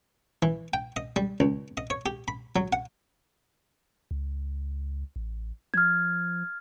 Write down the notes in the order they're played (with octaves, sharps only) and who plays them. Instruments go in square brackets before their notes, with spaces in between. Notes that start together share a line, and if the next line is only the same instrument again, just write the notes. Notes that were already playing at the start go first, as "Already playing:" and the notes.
[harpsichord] E3
G5
D#5
G3
C#2
D#5
C#5
G4
B5
F#3
F#5
[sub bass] C#2
A1
[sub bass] F3 [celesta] F6 G#6